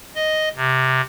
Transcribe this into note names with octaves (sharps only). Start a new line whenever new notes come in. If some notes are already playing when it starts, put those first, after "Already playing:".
D#5
C3